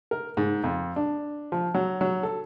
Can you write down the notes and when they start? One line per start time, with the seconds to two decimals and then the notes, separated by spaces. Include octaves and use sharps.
0.11 A#4
0.37 G#2
0.64 F2
0.96 D4
1.52 F3
1.74 F#3
2.01 F#3
2.23 A4